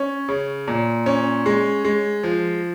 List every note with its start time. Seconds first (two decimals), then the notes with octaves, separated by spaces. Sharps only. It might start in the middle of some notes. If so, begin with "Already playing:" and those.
Already playing: C#4
0.28 C#3
0.68 A#2
1.06 C#4
1.46 G#3
1.85 G#3
2.23 F3